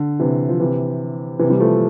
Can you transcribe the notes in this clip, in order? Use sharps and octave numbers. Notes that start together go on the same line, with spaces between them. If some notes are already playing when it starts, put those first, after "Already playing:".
Already playing: D3
C3 E3
F3
C3 E3
C3 E3
E3 G3
F3 A3